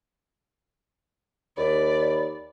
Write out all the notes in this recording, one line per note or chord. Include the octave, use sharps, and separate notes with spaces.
D#2 D5 B5